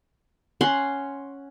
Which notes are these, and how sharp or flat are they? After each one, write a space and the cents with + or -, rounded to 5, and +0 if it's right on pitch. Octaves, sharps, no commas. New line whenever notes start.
C#4 +0 F#5 +0 C6 +0